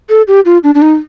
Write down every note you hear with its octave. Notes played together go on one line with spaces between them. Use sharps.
A4
G4
F4
D4
D4
D#4